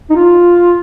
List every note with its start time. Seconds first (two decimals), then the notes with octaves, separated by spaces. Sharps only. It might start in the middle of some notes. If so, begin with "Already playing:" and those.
0.10 D#4
0.16 F4